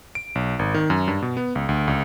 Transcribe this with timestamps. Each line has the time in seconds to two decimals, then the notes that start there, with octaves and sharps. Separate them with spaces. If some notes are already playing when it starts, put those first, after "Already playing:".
0.15 D7
0.35 B1
0.59 G#1
0.74 D#3
0.90 F#2
1.08 G2
1.22 B2
1.37 B3
1.55 C#2
1.69 D2
1.88 C#2